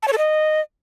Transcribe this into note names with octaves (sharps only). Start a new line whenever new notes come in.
A5
C#5
A4
D#5